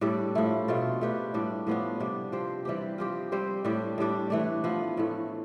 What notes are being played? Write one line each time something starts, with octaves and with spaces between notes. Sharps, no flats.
A2 G3 D4 A4
A2 F3 A3 E4
B2 A3 C4 F4
A3 D4 G4 B4
A2 G3 D4
A2 F3 B3 D4
C3 G3 D4
F3 C4 G4 C5
E3 G3 C4 G4
F3 C4 G4
G3 C4 G4 C5
A2 G3 D4 G4
A2 G3 D4
E3 A3 D4
F3 B3 E4
A2 E3 A3